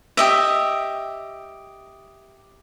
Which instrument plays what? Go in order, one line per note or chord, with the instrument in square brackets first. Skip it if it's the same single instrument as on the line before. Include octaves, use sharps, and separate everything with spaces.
[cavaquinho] G4 D#5 E5